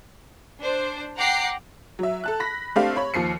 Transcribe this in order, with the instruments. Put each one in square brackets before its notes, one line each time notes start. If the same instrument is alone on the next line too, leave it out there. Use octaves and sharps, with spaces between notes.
[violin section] D4 C5
F#5 G5 A#5 D6 C7
[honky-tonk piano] F#3 E5
A4 A5 F#6
B5 A#6 B6
A3 C4 D4 G4 F5
C#5 B5 C#6
D#2 F3 C7 C#7